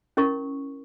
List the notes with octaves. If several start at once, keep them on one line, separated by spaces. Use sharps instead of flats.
C#4 E4 A#4 C#6